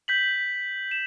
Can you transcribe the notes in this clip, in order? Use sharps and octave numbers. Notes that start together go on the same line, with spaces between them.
G6 B6 F#7
E7